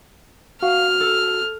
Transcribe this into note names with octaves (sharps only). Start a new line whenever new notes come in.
F#4 F5 F6
A4